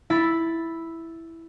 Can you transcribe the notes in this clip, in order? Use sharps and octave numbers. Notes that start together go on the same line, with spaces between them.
E4 B5 A6